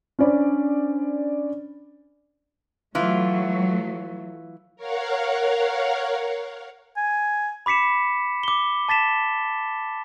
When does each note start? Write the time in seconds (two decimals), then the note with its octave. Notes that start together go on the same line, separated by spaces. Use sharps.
0.19 C#4 D4 C5 D5 B5
2.95 E3 F#3 A3 F4
4.76 A#4 C#5 F5 F#5
6.97 G#5
7.66 B5 D6 B6 C#7 E7
8.43 D6 G7
8.89 A5 A6 B6 E7